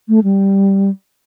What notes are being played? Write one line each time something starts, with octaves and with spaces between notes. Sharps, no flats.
A3
G3